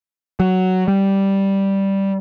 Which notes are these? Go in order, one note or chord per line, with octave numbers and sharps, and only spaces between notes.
F#3
G3